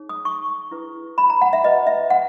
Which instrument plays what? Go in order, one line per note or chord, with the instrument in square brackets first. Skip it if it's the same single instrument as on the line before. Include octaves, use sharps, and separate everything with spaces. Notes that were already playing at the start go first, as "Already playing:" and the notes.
Already playing: [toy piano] D#4 G#4 C#5
D#6
C#6
E4 G#4 B4
B5
A#5
F#5
E5
F#4 B4 D#5
E5
F#5